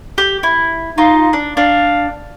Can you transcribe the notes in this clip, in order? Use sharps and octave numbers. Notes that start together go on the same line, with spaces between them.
G4
E4
D#4 F4
D4
D4 F5